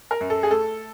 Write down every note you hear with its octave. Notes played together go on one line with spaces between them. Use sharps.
A#4
F#2
A4
G#4
A3 A4